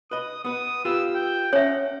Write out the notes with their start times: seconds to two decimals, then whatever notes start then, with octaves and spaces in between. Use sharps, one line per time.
0.11 B4 D#5 D#6
0.45 B3 B4 D#6
0.85 F4 G4 B4 E6
1.15 G5
1.53 C#4 C#5 E5 F#5